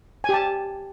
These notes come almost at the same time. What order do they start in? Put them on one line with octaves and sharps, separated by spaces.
G#5 G4 A5